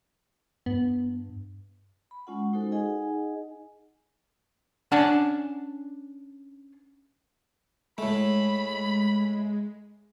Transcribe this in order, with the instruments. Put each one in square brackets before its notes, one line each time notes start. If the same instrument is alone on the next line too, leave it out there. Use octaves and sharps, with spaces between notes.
[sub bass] G2 [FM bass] B3
[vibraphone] B5
G#3 C#4 F4 F#5
G#3 D#4 F#4 A4 C5
D#4 G#4 D#5 F#5 G#5
[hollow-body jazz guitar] C#4 D4 D5 F#5 G#5 A5
[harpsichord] A2 A3 [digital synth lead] G#3 [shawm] B5